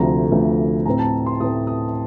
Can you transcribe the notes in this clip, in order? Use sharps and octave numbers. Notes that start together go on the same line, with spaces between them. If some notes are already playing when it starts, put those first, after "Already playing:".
Already playing: D2 C3 F3 A3 A#5
D2 C3 F3 A3
A2 A3 C4 A#5
A5
C6
A2 A3 C4 D#6
D#6